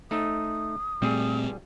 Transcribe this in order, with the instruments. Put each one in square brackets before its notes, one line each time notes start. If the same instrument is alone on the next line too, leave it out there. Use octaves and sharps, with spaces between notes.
[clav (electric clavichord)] A3 D#4 [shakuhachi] D#6
[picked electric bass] A#2 A3 C4 [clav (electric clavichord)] G3 G#4